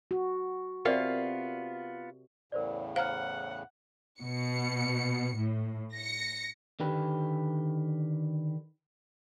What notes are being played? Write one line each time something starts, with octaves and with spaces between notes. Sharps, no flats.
F#4
C3 B3 F4 A#4 D5 F5
E2 A2 C#3 A#4 C5 D5
C5 F5 F#5 A#5 F6
B2 C#7
A2
A#6 C#7
D3 D#3 G4 B4